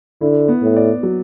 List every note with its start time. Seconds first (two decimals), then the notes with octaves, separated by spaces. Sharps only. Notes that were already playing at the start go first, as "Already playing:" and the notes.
0.21 D3 E4
0.48 B3
0.62 A2
0.76 D5
1.03 F#3